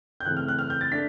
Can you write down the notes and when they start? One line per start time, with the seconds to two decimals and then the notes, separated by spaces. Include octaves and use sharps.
0.20 G6
0.25 C#3 E3 A3 C4 F#6
0.37 F6
0.48 F#6
0.59 F6
0.70 G6
0.81 A6
0.91 A3 D4 B6